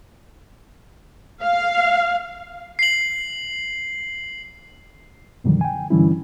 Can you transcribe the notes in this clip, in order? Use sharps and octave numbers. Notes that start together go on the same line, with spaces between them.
F5
C7 F#7
F#2 B2 D3 D#3 F3 G3
G5 G#5
G2 D3 E3 G3 C#4 E4